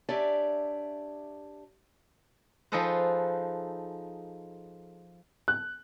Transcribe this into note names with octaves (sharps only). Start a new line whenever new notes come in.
D4 G4 C#5 D5 E5 G#5
F3 D#4 G#4 A4 B4 C5
F#6